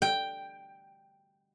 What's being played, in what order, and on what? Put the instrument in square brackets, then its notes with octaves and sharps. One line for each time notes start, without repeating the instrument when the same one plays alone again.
[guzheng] G5